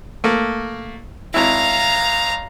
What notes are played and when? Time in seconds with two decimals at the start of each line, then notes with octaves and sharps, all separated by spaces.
0.24 A3 A#3
1.34 G#1 E4 F5 A#5